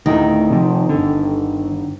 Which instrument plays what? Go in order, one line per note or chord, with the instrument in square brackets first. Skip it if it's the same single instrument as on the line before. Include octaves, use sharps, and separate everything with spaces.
[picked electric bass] D2 A2 [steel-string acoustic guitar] D#3
[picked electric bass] C3 F3
G1 D3